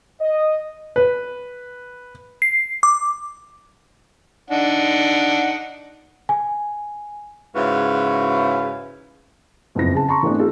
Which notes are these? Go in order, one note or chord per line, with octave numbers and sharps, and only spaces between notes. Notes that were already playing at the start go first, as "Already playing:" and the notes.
D#5
B4
C7
D6
D4 D#4 F#5
G#5
G#2 C#3 E4 F#4 B4 F5
F#1 F2 B3 E4 A#6
C#3 A5
A5 A#5 C6 C#6
E3 A3 B3 C4 D4
D#4 F4 A4